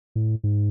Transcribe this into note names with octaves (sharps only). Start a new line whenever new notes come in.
A2
G#2